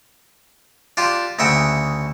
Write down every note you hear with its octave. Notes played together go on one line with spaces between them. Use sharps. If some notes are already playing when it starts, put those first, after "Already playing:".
D4 F4 G4
D2 C#3 E5 F#5 G5